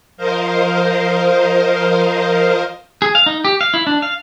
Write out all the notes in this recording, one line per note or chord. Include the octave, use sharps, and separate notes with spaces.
F3 A#4 C5 D#5 F5
G#4
F5
D#4
G4
F5
E4
D4
F5